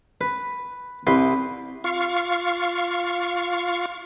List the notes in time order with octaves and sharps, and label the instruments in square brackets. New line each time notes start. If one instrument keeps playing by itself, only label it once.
[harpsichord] B4
C2 B4 C6
[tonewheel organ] F4 F5 C#6